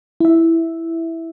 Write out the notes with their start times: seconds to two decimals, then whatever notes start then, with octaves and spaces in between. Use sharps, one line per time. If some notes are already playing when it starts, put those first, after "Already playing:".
0.20 E4 E5